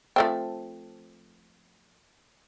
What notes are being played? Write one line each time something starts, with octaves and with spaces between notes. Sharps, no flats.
F3 A3 C4